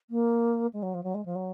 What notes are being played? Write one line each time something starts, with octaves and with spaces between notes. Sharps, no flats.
A#3
G#3
F#3
F3
F#3
G#3
F3
F#3